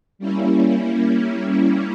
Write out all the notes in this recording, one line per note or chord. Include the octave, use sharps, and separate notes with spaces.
G3 A#3 C#4 E4